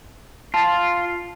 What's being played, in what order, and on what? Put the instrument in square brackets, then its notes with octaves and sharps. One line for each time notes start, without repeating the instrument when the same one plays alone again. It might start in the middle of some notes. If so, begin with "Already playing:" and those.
[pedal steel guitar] F4 [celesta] A5 A6